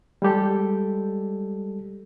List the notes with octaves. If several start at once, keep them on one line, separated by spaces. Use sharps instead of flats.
G3 G#3 G4 A4